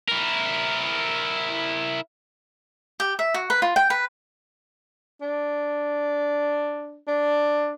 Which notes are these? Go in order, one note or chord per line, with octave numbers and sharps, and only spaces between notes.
E4 A#4
G4
E5
F#4
B4
F4
G5
B4
D4
D4